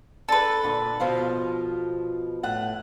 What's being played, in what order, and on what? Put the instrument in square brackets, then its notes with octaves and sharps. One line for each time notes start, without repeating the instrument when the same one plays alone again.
[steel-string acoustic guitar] D4 [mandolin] A4 B4
[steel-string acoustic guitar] A#2 D3
B2 F3 F4
A2 F#5